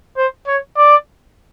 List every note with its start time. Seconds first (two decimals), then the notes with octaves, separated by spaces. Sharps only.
0.17 C5
0.47 C#5
0.77 D5